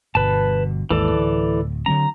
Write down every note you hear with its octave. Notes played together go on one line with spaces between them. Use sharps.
G1 B2 B4 A5
G#1 D#2 G#2 E3 A4 D5
D1
D3 F#3 C4 A#5